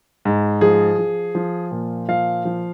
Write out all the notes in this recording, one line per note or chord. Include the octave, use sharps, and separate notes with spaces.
G#2
F3 G#4
F3
F3
A#2
F3 F5
F3